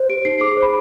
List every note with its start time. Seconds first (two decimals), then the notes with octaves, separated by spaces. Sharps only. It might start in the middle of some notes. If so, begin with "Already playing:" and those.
Already playing: C5
0.09 G4 D7
0.25 D#4 C7
0.41 G#4 D6
0.52 D6
0.57 C5
0.62 B5